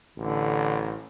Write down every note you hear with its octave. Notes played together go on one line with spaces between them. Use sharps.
A1 D3